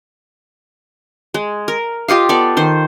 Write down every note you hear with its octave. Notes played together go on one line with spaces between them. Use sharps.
G#3
A#4
F4 G4 D#5 F5
B3 A4 D5
D#3 C5